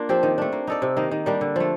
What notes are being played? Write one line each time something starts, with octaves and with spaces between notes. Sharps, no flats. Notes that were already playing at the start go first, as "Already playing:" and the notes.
Already playing: A#3 D4 F4
F3 C4 G4
D#3
A3 D4
A#3
D#4 A4 D5
C3
D#3 A#3 D#4
D#3
G3 A#3 D4
D3
F3 A3